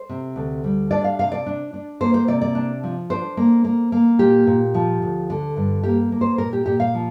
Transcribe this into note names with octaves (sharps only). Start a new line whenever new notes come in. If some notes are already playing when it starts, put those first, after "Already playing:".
Already playing: C5
C3
D2
G3
D4 D5
F5
C3 F5
D5
D4
D4
A#3 C5
C5
C3 D5
D5
D4
F3
D4 C5
A#3
A#3
A#3
A#2 G4
A#2
F3
D2
D3
G2
A#3 G4
A#3
C5
A#2 A#4
G4
A#2 G4
F5
F3